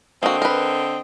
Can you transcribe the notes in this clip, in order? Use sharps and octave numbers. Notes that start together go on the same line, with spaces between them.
D3 A#3 C4 F#4 D#5
A#4 B4